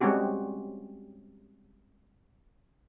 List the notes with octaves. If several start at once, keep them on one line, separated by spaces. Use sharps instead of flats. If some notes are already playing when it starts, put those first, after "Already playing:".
G3 G#3 C4 C#4 F#4 G4